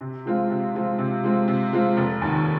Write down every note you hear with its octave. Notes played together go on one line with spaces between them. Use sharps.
C3
F3 G#3 C4 F4
C3
F3 G#3 C4 F4
C3
F3 G#3 C4 F4
C3
F3 G#3 C4 F4
F1
D#2 D#3